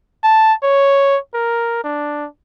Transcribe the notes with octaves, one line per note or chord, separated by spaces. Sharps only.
A5
C#5
A#4
D4